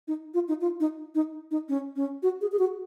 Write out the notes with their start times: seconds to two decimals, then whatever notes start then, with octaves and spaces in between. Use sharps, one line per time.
0.08 D#4
0.34 F4
0.48 D#4
0.61 F4
0.80 D#4
1.15 D#4
1.51 D#4
1.69 C#4
1.96 C#4
2.23 F#4
2.41 G#4
2.52 G#4
2.59 F#4